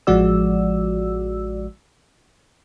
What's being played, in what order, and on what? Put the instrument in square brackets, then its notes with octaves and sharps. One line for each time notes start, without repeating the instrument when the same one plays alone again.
[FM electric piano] A1 F3 G#3 F#4 D5 E6